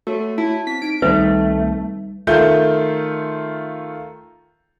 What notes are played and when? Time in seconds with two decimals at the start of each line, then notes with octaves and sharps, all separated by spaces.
0.07 A3 F#4 C#5
0.38 E4 A5
0.67 C4 B6
0.82 D#4 B6 D7
1.02 C2 D#3 G3 A3 C4 D#4 B4
2.27 D#3 A3 F4 A4 G6